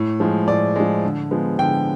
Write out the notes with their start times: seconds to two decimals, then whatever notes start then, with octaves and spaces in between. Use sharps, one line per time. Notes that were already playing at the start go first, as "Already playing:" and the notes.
Already playing: A2
0.20 F3 G#3
0.47 A2 D5
0.76 F3 G#3
1.03 D3
1.31 F3 G#3 B3
1.59 D3 G5